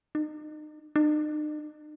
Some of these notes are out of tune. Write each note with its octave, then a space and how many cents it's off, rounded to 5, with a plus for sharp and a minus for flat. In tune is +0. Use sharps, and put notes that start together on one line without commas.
D#4 -35
D#4 -45